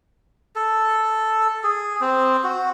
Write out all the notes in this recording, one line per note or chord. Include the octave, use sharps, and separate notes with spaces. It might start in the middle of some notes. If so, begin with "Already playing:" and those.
A4
G#4
C4
F#4